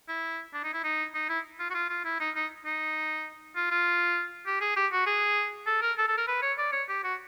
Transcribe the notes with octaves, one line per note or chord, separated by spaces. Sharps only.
E4
D4
D#4
E4
D#4
D#4
E4
F4
F#4
F4
F4
E4
D#4
D#4
D#4
F4
F4
G4
G#4
G4
F#4
G#4
A4
A#4
A4
A4
A#4
B4
C#5
D5
C#5
G4
F#4